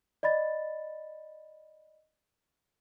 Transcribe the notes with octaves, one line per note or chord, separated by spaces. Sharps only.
D5 D#5 B5 A6